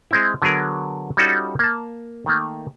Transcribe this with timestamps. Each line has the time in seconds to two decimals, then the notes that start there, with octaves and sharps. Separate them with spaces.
0.11 G#3 C4 E4
0.42 D3 F#3 B3 G#4 A#4
1.17 G3 C#4 D#4 F4 F#4 A4
1.59 A#3 A5
2.26 D#3 A3 A#3